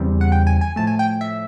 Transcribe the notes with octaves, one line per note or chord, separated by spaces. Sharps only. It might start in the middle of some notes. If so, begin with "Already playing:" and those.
Already playing: E2 C#3 E3 G3 C4
F#5
G5
G#5
G#5
A2 F3 A3 A5
G#5
G5
E5